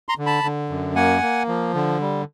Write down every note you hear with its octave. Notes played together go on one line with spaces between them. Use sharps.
A#5 C6
D3
A5 B5
D3
F#2
A#3 F#5 G#5
A#3
F3
D3
G3